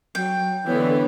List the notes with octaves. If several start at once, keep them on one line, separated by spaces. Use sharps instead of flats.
F#3 G5
D3 E3 B3 C#5